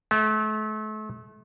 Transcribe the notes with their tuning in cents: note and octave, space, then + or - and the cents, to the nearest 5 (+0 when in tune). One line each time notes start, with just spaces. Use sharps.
A3 -35